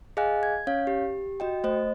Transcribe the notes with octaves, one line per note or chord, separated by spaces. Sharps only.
G#4 D#5 F5 G#5 F#6
G#6
C#4 C#5 F5
G4
F#4 D#5 G5
A3 C5 D#5